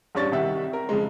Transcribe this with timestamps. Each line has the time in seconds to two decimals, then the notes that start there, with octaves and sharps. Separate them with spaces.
0.15 A1 G2 D4 C#5 C#6 A6
0.32 C2 D#3 G3 E5 F#5
0.73 A#4
0.89 F2 C#3 G#3